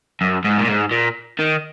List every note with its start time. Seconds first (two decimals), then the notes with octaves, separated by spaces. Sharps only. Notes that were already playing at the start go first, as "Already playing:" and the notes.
0.21 F#2
0.44 G#2
0.58 A#2
0.68 G#2
0.91 A#2
1.39 D#3